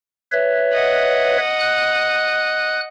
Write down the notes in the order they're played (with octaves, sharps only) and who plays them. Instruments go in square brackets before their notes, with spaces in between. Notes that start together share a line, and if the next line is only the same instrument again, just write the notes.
[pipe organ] B4 C#5 E5
[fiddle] D#5 F#5
[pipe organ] F#6